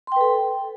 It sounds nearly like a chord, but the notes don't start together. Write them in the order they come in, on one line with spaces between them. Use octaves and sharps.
C6 G5 B4 A4